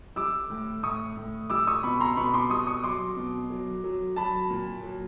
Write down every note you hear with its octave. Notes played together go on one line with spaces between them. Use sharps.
G3 D6 E6
A2
A2 C#6 D#6
A2
G3 D6 E6
C#6 D#6
B2 B5 C#6
A#5 C6
B2 B5 C#6
C6 D6
G3 C#6 D#6
C#6 D#6
F#3 C6 D6
B2
F#3
F#3
F#3 A5 B5
A#2
F#3